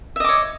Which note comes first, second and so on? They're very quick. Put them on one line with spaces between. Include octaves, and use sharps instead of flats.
E5 D#5 D6 C#5